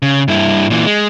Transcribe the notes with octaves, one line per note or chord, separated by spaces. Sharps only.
C#3
G2 E4
A#2 E3
G#3